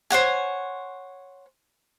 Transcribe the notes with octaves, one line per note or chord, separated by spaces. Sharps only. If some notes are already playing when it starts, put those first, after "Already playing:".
C5 C#5 F#5 G#5